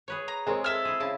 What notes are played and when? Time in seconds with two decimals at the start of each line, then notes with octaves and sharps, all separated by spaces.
0.08 G#4 B4 C#5
0.28 A#5
0.47 G#3 C4 G#4 A#4 C#5
0.64 A4 E5 F6 G#6
0.85 E4 G#4
1.00 C#3 E4 A5